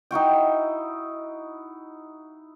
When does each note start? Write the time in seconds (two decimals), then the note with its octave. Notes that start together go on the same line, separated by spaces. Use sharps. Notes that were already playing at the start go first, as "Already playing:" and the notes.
0.11 D#4 E4 F#4 G5